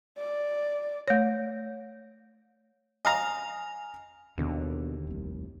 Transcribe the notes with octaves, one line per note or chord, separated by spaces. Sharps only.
D5
A3 C#5
D#5 F5 G#5 A#5 F7
D#2 B2 D3 E3
F1 C2